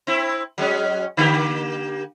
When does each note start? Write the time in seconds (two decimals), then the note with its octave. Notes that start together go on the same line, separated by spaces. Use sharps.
0.07 C4 E4
0.58 F#3 G#3 C#4
1.17 D3 A#3 G4